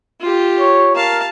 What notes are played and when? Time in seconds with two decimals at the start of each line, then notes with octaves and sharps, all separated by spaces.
0.21 F4 G4
0.59 C#5
0.95 A#4 F5 A5